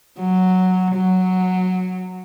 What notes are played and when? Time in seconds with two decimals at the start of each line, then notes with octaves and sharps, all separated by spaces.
0.19 F#3
0.94 F#3